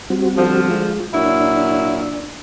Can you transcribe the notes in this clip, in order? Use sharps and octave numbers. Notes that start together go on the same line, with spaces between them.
G3 C4 F#4
D3 F3
G#3 F4
A#2 F#3 D4 E4